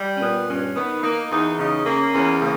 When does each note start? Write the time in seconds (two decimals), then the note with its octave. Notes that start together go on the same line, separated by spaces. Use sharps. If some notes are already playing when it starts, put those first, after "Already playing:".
Already playing: G3
0.15 C#4
0.21 A#2 B3
0.48 G2 C#4
0.76 D#3 B3
1.03 A#3 D#4
1.31 E2 D#4
1.58 C#3 D#4
1.86 A#3 C#4
2.13 E2 C#4
2.40 C#3 A#3